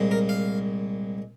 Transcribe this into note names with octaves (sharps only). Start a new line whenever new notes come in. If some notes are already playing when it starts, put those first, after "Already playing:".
Already playing: C2 A#2 G#3
A#4
F5